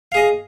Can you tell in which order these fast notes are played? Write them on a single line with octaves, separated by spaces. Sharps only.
F5 G#4 D#5